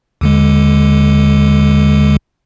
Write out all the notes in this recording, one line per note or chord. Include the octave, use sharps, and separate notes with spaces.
D#2 D3 G#3